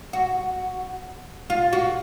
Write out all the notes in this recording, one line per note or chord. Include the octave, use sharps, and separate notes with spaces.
F#4
F4
F#4